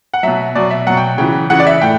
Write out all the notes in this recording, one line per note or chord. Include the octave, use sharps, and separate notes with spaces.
F#5
B2 F#3 E5
B2 F#3 D5
E5
B2 F#3 F#5
G5
C#3 E3 G5
C#3 E3 F#5
D5
E5
A2 G5